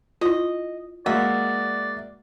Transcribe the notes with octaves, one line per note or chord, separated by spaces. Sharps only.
E4 F4 D#5
G#3 A#3 F#4 D5 E5